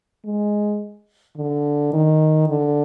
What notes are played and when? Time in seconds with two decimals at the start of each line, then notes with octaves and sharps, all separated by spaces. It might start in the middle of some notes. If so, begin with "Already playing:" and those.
0.25 G#3
1.37 D3
1.93 D#3
2.48 D3